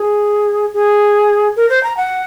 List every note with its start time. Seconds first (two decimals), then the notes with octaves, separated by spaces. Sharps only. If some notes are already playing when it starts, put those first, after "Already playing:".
Already playing: G#4
0.74 G#4
1.56 A#4
1.70 C5
1.83 A#5
1.97 F#5